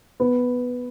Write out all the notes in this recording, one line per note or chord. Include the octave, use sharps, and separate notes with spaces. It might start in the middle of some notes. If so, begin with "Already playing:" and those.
B3